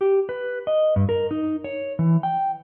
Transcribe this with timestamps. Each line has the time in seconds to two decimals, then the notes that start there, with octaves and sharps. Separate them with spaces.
0.01 G4
0.29 B4
0.67 D#5
0.96 G2
1.09 A#4
1.31 D#4
1.64 C#5
1.99 E3
2.23 G5